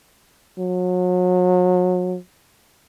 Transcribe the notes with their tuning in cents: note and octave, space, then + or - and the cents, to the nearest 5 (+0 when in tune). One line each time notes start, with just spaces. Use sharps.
F#3 -35